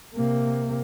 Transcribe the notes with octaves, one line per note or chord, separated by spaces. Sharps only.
C3 A#3